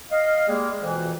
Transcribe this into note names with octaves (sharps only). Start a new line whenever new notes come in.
D#5 F5
G3 G#3 A#3 G#4
F2 B2 E3